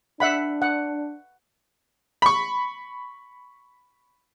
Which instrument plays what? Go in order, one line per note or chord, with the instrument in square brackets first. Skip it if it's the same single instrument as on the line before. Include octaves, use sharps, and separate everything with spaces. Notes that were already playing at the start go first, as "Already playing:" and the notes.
[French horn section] D4 [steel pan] E5 F#5 B5
[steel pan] F#5
[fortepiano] B5 C#6